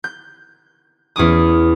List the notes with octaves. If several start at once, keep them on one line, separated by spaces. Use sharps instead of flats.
G6
E2 C#4 D6 D#6